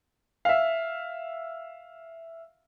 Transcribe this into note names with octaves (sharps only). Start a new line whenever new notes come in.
E5 F5